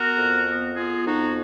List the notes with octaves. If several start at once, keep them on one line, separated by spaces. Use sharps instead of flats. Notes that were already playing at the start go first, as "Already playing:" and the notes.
Already playing: B3 F#4 A#4
F2
B3
B3 F4 G#4
F2 D#4 F#4